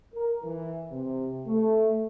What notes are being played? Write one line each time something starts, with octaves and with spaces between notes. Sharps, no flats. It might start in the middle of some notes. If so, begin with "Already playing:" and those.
A#4
E3
C3
A3